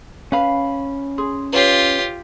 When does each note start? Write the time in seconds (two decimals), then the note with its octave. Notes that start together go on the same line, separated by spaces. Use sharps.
0.32 C#4 B4 F5 B5
1.18 G#4 C6
1.53 F4 G4 B4 C#5 C7